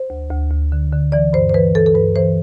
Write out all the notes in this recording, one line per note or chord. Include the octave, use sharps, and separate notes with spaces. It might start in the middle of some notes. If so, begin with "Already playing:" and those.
Already playing: C5
D2
D2
D2
D3
D3
E3 D5
G2 C5
C5
E3 B4
E3 A4
A4
G2 B4
E3 C5